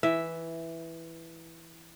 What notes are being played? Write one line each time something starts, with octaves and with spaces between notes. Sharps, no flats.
E3 E5